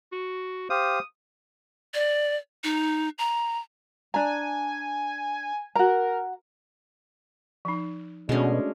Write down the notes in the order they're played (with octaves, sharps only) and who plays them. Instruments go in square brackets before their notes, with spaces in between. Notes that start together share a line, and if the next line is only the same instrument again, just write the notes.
[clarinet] F#4
[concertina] G4 C5 F5 [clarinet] D#6
[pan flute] D5
D#4
A#5
[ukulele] D4 A#5 [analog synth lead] G#5
[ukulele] F#4 A#5 [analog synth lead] A#4
[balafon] F3 D#4
[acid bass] B2 [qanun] G#3 C#4 [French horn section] A3 D4 F#4